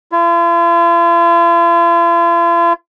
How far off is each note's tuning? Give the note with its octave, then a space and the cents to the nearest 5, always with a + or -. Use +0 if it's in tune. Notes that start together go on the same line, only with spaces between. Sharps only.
F4 -45